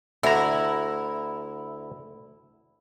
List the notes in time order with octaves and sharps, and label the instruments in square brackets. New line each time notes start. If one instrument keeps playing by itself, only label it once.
[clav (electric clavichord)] D2 D3 A#5 [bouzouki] E4